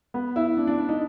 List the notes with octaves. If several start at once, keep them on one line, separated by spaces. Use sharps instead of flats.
B3
E4
D4
D4
D4
D#4